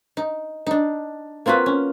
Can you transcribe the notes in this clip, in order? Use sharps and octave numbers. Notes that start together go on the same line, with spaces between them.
D#4
D4 D#4
A#3 C4 F4 F#4 B4
C#4